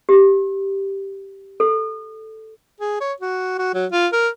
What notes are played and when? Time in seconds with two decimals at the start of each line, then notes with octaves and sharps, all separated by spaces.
0.09 G4
1.60 A4
2.80 G#4
3.01 C#5
3.20 F#4
3.59 F#4
3.74 F#3
3.92 F4
4.13 A#4